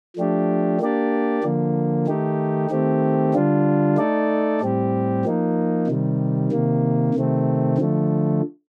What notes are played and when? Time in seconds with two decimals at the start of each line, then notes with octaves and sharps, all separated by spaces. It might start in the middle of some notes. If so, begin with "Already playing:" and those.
0.16 F3 A3 D4 G4
0.80 A#3 D4 G4 D5
1.44 D3 F3 A#3
2.07 D#3 A3 D#4 G4
2.70 D#3 A3 C4 G4
3.34 D3 G3 D4 F4
3.97 A3 D#4 A4 D5
4.61 A2 G3 C4 G4
5.25 F3 A#3 D#4
5.88 C3 D#3 G3
6.51 C3 D#3 A#3
7.15 C3 D#3 A3 C4
7.78 D3 F3 A3